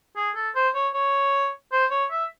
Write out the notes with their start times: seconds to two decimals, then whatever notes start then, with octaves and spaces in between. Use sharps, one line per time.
0.16 G#4
0.35 A4
0.55 C5
0.75 C#5
0.94 C#5
1.72 C5
1.91 C#5
2.11 E5